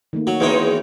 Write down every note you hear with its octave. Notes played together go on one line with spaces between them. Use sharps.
D#3 A3 A#3
F#3 F#4
E2 D#3 E3 G#3 C#4 D#4